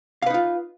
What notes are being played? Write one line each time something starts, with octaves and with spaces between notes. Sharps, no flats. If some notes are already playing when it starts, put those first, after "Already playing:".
D#4 F4 B4 F5